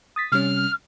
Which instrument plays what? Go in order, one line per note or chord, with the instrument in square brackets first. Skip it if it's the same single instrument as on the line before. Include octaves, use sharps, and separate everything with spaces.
[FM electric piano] D#6 A6 B6
[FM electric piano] C3 G3 C#4 [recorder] F6